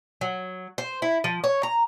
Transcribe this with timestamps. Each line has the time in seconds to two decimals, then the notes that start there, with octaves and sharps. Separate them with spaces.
0.21 F#3
0.78 C5
1.02 E4
1.24 F3
1.44 C#5
1.63 A#5